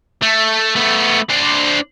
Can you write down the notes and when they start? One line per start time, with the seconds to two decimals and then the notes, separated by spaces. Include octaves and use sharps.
0.22 A3
0.76 A3 B3
1.30 D4 C5